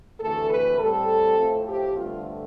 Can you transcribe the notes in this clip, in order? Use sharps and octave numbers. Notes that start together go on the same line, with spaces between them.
D2 C3 E3 A3 A4
B4
A2 G3 C4 A4
A2 F3 A3 C4
G4
G2 D3 A3 C4 F4